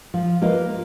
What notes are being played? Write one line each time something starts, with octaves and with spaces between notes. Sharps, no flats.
F3
A#3 F4 B4 D#5